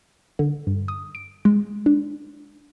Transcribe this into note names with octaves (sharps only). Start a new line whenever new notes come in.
D3
G2
D#6
D7
G#3
D4